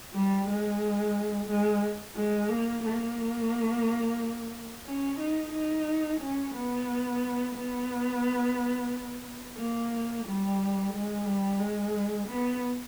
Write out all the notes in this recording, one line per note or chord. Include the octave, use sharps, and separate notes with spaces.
G3
G#3
G#3
G#3
A#3
A#3
C#4
D#4
D#4
C#4
B3
B3
A#3
G3
G#3
G3
G#3
B3